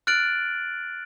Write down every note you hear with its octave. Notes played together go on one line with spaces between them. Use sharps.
F6 F#6 A6 D7 F#7